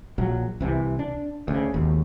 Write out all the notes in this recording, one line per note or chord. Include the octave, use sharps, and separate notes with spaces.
A#1 F#3
C2 C3 E3
D4
D2 C#3
G#1 D#2